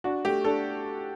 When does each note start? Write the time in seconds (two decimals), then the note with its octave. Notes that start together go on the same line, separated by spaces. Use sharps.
0.04 D4 F#4
0.25 A3 G4
0.45 D4 A4